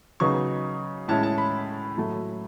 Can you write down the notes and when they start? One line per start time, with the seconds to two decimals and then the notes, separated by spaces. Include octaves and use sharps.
0.20 C#3 F#3 B3 D#4 C#6
1.08 A2 G#3 C#4 E4 A5
1.23 A5
1.38 B5
1.97 A2 F#3 A3 E4